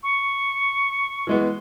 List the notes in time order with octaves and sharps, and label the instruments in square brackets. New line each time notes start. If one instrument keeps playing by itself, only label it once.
[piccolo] C#6
[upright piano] E3 G#3 B3